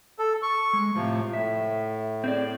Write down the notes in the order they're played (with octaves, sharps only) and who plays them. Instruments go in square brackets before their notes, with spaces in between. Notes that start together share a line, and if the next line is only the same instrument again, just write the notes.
[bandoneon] A4
C#6
[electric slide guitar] G#3
[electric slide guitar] A2 [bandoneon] C3 F3
[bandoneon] A2 [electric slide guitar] E5
[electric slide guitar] C4 G#4 D5